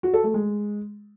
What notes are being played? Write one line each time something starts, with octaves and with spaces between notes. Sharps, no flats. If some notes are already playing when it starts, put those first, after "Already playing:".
F#4
A4
A3
G#3